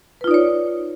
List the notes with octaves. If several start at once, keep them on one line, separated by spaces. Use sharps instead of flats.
D#4 F4 B4 C#5 D5